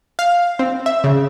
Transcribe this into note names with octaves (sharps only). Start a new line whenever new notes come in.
F5
C4
E5
C#3